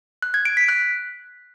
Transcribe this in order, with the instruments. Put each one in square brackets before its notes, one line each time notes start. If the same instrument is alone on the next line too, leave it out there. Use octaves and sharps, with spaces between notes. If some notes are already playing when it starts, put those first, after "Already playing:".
[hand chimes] F#6
G#6
D7
B6
F#6